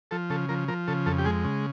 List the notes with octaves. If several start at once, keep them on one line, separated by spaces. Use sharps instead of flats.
F3 A4
C#3 A4
F3 A#4
F3 A#4
C#3 A4
F2 A4
G4
G#3 G#4
C#3